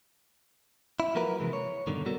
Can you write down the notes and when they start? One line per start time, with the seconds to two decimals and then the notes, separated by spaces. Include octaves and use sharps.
1.00 E4
1.15 F3 F#3 A#3 F#4 A#4 B4
1.40 C3 E3 G#3
1.53 C#5
1.87 G2 B2 D3 D#3
2.05 G3 B3 F#4 A4 A#4